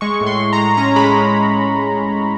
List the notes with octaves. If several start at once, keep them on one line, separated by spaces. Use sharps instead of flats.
G#3 C#6
A2
C6
A2
A#5
G#3
C#4 A#5
G#3 B5